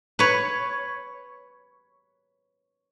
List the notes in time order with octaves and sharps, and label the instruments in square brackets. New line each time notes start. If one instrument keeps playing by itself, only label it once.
[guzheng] B4 C#5